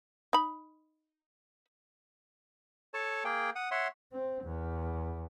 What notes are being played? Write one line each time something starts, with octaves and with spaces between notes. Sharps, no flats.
D#4 B5
A4 C#5 A5
A#3 G#4 G5
F#5 D#6
C#5 E5 F#5 C6
C4
E2